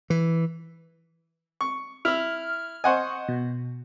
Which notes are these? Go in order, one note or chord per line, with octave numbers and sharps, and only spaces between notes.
E3
C#6
E4 E6 F6
C5 D#5 F#5 G#5 C#6
B2